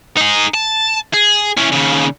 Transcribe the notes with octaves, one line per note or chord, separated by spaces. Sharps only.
D#4 G#4
A5
G#4
E3 C#4
D#2 C#3